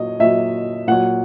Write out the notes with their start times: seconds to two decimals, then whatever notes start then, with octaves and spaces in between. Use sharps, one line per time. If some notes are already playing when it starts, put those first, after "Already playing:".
Already playing: A#2 F#3 D#5
0.19 A#2 F#3 E5
0.88 A#2 F#3 F#5